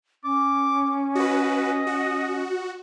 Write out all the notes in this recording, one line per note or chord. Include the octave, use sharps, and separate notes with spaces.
C#4 D6
F#4 B4 D#5
F#4